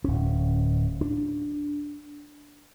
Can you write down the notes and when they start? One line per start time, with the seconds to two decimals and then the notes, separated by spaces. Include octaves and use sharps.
0.04 D1 C#4
1.01 D4